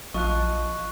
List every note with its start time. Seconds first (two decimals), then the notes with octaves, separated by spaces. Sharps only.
0.14 A#1 F3 F4 D#5 C#6 F#6